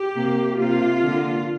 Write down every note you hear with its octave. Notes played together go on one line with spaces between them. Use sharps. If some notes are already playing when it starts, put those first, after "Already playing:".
Already playing: G4
C3 A#3
C3 A#3 F4
D3 A#3